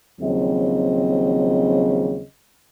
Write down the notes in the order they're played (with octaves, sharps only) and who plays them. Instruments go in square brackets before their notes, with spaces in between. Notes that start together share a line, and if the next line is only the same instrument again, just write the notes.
[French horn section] D#2 C#3 F3 F#3 C4 D#5